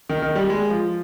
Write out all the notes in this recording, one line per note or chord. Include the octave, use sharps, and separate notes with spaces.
D#3
D#3
G3
G#3
F3